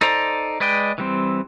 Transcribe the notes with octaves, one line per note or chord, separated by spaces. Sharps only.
D#4 A4 C5 D5 A#5
G#3 B4 D5 D#5 G5
E3 G3 C4